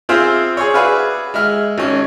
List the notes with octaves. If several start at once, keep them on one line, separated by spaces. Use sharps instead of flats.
C4 F4 G#4 C5 E5 F5
G#4 C#5
F#4 G#4 B4 D5 E5 F5
G#3 E5 F6
G#1 C#4